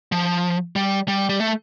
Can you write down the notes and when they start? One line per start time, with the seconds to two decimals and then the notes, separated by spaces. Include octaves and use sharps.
0.12 F3
0.76 G3
1.08 G3
1.29 G3
1.40 A3